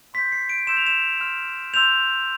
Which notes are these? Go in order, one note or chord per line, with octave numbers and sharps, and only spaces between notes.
C6 G6 B6
C7
D7
C6 E6 G6 E7
F7
E7
C6 F6
C6 E6 G6 F7